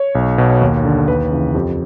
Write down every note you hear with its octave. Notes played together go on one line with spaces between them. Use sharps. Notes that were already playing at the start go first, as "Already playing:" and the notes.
Already playing: C#5
B1
B2
D#2
D3
D#2 B4
C#3 E3
F2 G4